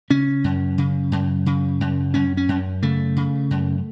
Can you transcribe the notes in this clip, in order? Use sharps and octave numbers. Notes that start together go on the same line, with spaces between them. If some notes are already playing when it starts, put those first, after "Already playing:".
C#3 C#4
F#2
C#3
F#2
C#3
F#2
F#2 C#4
C#4
F#2
C#3 A3
C#3
F#2